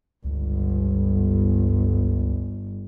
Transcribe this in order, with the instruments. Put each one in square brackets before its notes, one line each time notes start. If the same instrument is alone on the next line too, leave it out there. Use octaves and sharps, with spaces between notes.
[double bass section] G1 [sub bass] C#2